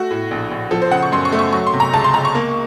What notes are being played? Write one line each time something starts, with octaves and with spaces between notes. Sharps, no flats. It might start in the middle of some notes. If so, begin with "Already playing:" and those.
Already playing: A3 F#4
A2
A#1
A#1
F3 A4
C5
C#3 F#5
C#6
F#2 C6
C#6
A3
C#6
F#3 C#6
C6
C3
A#5
C#2 A5
C6
C#2 A#5
C#6
A#3